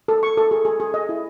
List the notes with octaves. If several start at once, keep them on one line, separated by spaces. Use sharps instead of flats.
A4
C#6
A4
G#4
G#4
G#4
D#5
E4